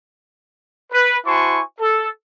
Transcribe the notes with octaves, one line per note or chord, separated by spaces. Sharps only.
B4
E4 F#4 C5 G#5 A5 C#6
A4